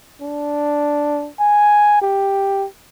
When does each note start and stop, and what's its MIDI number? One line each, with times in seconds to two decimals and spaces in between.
0.21 1.30 62
1.39 1.99 80
2.01 2.66 67